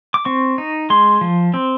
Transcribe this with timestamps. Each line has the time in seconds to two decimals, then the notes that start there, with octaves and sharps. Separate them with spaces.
0.14 D6
0.25 C4 C#6
0.58 D#4
0.90 G#3 C6
1.21 F3
1.54 C4